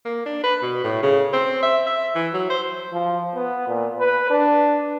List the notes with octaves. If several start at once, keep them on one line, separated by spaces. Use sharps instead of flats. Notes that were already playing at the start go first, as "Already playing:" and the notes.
A#3
D4
B4
B2
A2
C#3
C4
E5
E5
E3
F#3
C5
F3
B3
A#2
B4
D4